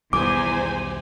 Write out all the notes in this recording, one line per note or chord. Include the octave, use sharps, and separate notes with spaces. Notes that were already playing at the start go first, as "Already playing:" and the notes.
B1 E2 D#3 G3 C5 G#5 D6